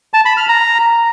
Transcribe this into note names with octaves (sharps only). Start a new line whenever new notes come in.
A5
B5
F6
A#5